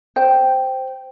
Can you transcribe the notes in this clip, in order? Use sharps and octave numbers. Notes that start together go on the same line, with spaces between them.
C5 G5